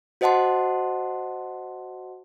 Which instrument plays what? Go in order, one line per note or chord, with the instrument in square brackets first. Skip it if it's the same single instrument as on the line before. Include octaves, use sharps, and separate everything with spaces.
[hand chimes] F#4 C5 D#5 F#5 A5 C6